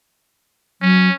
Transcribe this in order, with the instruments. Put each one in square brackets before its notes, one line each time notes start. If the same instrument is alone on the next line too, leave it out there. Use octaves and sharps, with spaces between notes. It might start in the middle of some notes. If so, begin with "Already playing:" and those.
[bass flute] F#3 [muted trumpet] C#4